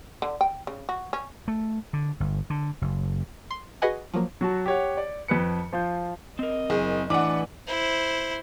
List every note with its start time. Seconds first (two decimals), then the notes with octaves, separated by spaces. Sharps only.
0.22 D3
0.41 G5
0.67 C#3
0.89 F#4
1.13 C#4
1.48 A3
1.93 D3
2.20 G1
2.50 D3
2.82 F#1
3.51 C6
3.82 F#4 G#4 B4 D#5 F#5 G#5
4.14 F3 F#3 A#3
4.41 F#3 F#4 A5
4.66 G4 C#5 F#5
4.97 D5
5.28 F2 F3 B4 C#7
5.72 F3 F4 G6
6.39 C4 A#4 D#5
6.70 F#1 G#4
7.10 A2 E3 D4 B4 F#5 G#5 D6
7.67 E4 C5